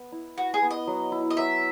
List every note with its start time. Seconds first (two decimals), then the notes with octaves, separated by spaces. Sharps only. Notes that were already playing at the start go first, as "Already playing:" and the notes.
Already playing: B3 B4
0.12 E4
0.38 F#4 B4
0.54 G#4
0.63 B3
0.71 D#5
0.87 F#3
1.12 E4
1.30 D#5
1.37 F#3 E5